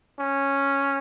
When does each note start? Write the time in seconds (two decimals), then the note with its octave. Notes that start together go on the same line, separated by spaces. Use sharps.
0.20 C#4